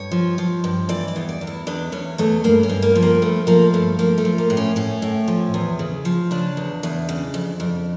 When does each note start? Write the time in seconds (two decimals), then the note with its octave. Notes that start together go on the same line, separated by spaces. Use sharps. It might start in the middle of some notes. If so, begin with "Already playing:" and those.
Already playing: G2 C#5
0.11 F3
0.38 F3
0.64 G2
0.89 E3 D5
1.08 D5
1.16 E2
1.29 D5
1.41 E2
1.47 E4
1.67 E2 D4
1.92 E2 C#4
2.18 E2 A3
2.44 G2 A#3
2.63 C#4
2.69 G2
2.82 A#3
2.95 F3
3.02 A#3
3.22 G2 A3
3.47 F3 A#3
3.74 G2 A3
3.99 F3 A#3
4.18 A3
4.25 F3
4.38 A#3
4.50 A2
4.57 C#4
4.76 A2 C#4
5.02 A2
5.28 F3
5.54 E2
5.79 C#3
6.05 F3
6.31 C#3 D4
6.57 E2
6.83 E2
7.09 C#3
7.34 F2
7.60 F2